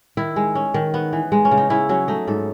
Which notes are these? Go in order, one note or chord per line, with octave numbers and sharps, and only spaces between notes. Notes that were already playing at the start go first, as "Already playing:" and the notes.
D#3 E4
G#3
C#4
D#3
B3
E3
G#3
C#4
C#3
D#4
C#4 E4
F#3 C#4
A3 D#4
G#2 A4